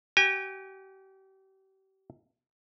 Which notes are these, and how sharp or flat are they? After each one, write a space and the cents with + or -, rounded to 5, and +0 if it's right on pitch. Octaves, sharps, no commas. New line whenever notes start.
G4 -35 G#5 -45